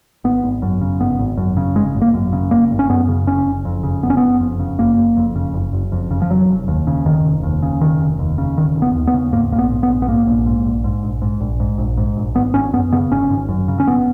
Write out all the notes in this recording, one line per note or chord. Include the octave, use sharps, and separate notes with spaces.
G#1 B3
G#1
F#2
C#3
G#1 B3
G#1
F#2
C#3
G#1 G#3
G#1
A#3
F#2
C#3
G#1 A#3
G#1
C#4
F#2 B3
C#3
F#1 C#4
F#1
F2
C#3
F#1 B3
C#4
F#1 B3
F2
C#3
F#1 A#3
F#1
F2
C#3
F#1
F#1
F2
C#3
F3
F1 F#3
F1
D#2
C#3
F1 D#3
F1
D#2
C#3
F1 D#3
F1
D#2
C#3
F1 D#3
F1
B3
D#2
B3
C#3
G#2 A#3
A#1 A#3
B3
G#2
B3
A#1
B3
G#2 A#3
A#1
G#2
A#1
G#2
A#1
G#2
A#1
G#2
A#1
G#2
A#1
G#1 B3
G#1 C#4
F#2 B3
C#3 B3
G#1 C#4
G#1
F#2
C#3
C#4
G#1 B3